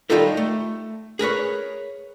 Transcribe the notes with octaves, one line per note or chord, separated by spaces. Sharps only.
D#3 G3 D#4 F4 A4 A#4
A3
G#4 A#4 B4 C#5